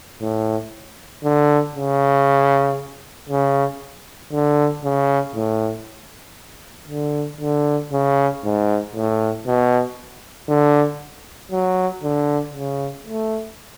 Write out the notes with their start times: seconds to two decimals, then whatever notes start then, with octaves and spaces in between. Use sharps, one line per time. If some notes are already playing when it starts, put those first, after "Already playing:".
0.21 A2
1.24 D3
1.75 C#3
3.29 C#3
4.33 D3
4.84 C#3
5.35 A2
6.89 D3
7.41 D3
7.92 C#3
8.44 G#2
8.95 A2
9.46 B2
10.48 D3
11.52 F#3
12.03 D3
12.54 C#3
13.05 A3